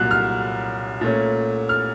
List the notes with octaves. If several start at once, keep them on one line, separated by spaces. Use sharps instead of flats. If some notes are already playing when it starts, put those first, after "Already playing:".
Already playing: C2 A#2 F#3 F#6
F6
A#2 A3 C#4
F6